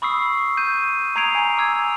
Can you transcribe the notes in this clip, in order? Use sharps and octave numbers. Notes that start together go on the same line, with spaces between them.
B5 C#6 D#6 E6 C7
G6 D#7
A#5 D#6 G#6 C7 D7 F7
G#5 A#5
D6 E6 G#6